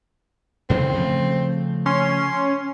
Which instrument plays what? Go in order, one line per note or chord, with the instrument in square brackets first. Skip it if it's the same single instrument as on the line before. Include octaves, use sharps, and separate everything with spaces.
[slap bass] E2 C#3 F#3 [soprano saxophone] C4
[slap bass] C#3 F3 A3
[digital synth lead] C#4 [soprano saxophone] C6